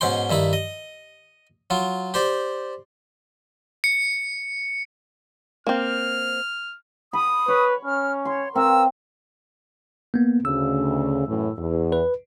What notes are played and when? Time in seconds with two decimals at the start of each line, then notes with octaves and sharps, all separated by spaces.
0.01 G#2 B2 C#4 G5 C6
0.30 G2 D#3 E4 B5
0.53 D#5
1.70 F#3 F4
2.14 G4 C5 D5
3.84 C#7
5.67 A#3 C4 F6
7.13 B5 D#6
7.48 B4 C#5
7.85 C#4 F6
8.25 C#5 C6
8.56 C4 A#4 F5 E6
10.14 A#3 B3
10.45 D2 C#3 E6
11.28 F#2 A2 E3
11.58 E2
11.92 B4